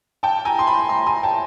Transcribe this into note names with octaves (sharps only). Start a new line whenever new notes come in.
G5 A5
G#5 A#5
C6
A5 B5
A#5 C6
G#5 A#5
G5 A5